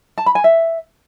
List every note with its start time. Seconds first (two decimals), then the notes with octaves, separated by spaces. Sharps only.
0.18 A5
0.26 B5
0.35 G#5
0.44 E5